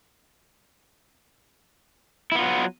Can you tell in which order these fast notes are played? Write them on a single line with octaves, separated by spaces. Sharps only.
E4 B3 F4 F#3